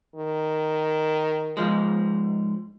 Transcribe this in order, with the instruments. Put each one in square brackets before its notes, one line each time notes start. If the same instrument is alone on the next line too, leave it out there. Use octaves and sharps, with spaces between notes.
[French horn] D#3
[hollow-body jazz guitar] G#2 F3 G#3